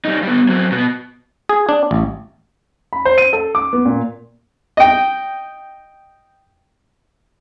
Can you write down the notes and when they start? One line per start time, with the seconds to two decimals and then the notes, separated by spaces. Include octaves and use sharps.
0.05 G3 D#4
0.23 G3 B3
0.49 F#3 C4
0.72 B2 B3
1.49 G#4
1.69 D4
1.91 A1
2.93 B5
3.05 C5
3.18 D#7
3.33 A4
3.55 D6
3.73 B3
3.85 A#2
4.77 D#5 G5